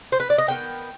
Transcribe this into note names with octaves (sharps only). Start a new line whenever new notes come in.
C5
B4
D5
D#5
D#3 G3 B3 G5